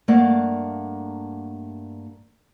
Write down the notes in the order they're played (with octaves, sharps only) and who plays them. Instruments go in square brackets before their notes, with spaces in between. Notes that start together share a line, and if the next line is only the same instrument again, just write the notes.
[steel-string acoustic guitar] G2 A3 A#3 D5 F5 F#5